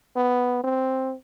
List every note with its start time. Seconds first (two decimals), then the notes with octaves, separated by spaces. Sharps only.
0.16 B3
0.64 C4